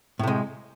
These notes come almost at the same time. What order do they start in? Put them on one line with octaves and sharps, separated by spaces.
A2 C3 G#3